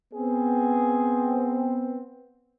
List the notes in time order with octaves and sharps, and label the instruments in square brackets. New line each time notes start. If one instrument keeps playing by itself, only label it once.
[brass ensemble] B3 C4 [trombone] G#4